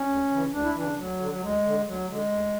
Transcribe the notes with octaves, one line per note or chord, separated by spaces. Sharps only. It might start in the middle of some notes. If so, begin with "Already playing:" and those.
Already playing: C#4
D2
C#3 E3
D2 D4
E4
C#3 E3 D4
D2 F#3
D3
F#3
D2 G#3
D3
D2 F#3
D3 G#3
D2